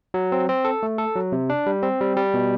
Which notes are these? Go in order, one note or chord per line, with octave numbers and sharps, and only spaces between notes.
F#3
C4
C4
A4
A3
A4
F#3
C3
D4
G3
C4
G3
G3
B2